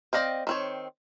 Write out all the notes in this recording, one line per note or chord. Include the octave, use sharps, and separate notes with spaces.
C4 D5 D#5 F5 G5
D#3 C4 C#5